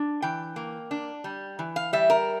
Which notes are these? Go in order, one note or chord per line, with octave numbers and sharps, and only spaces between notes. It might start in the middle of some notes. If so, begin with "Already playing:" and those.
Already playing: D4
E3 G5
A#3
D4
G3
E3
F5
G3 E5
A#4